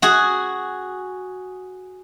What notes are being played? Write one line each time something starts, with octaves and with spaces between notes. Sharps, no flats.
F#4 G#4